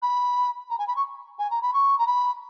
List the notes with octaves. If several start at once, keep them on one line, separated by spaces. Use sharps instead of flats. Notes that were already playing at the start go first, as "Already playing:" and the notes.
B5
A#5
G#5
B5
C#6
G#5
A#5
B5
C#6
A#5
B5